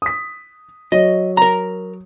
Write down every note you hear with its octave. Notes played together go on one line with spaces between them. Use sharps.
D#6 B6
F#3 C#5 D#5
A#4 A#5